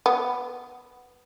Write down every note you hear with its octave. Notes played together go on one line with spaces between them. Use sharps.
B3